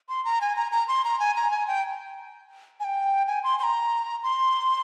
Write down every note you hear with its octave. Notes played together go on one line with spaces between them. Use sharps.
C6
A#5
G#5
A#5
A#5
C6
A#5
G#5
A#5
G#5
G5
G#5
G5
G#5
C6
C6
A#5
C6